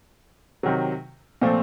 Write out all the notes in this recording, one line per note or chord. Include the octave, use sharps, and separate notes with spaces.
C3 D#3 F#3
A#2 F3 A3 C4